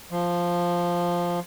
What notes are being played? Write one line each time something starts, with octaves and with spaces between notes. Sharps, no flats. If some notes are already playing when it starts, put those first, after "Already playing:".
F3